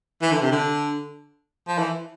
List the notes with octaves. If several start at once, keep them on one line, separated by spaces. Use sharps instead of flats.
E3
D3
C3
D3
F3
E3